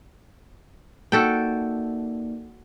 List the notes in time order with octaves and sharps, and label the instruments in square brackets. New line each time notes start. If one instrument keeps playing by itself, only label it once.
[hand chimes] A#3 D#4 D5 [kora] F#4 A4 G5